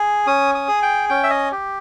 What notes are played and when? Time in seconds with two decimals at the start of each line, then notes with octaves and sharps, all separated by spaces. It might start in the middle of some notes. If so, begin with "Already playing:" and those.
Already playing: G#4
0.27 C#4 D#6
0.55 D#6
0.68 G#4
0.83 G5
1.09 C#4 G5
1.23 E5
1.30 D#5
1.52 G4